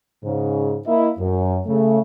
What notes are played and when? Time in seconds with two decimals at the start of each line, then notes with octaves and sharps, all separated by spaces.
0.24 G#2 C#3
0.87 A#3 E4 D#5
1.19 F#2
1.67 C#3 A3